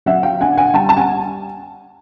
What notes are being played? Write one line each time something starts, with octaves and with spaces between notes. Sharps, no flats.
F#3 E5 F#5
F5 G5
D4 F#5 G#5
F#5 G#5
G3 G5 A5
A5
F#5 G#5